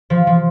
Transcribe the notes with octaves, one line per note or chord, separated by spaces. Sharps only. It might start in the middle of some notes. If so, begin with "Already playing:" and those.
F3
F3